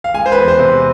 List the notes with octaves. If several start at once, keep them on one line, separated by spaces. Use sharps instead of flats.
F5
G#3 G#5
C5
B4
E2
C5
C3